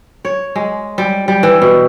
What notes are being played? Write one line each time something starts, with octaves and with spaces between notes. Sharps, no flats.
C#5
G#3
G3
G3
E3
B2